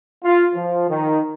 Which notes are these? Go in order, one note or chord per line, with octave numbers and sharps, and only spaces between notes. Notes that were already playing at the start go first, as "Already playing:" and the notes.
F4
F3
D#3